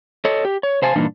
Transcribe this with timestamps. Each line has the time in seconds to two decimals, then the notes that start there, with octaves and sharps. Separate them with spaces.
0.25 A4 C#5 D#5
0.45 G4
0.63 C#5
0.82 C3 C5 F5 G#5 A5
0.95 G2 A#2 E3 A#3 D4 D#4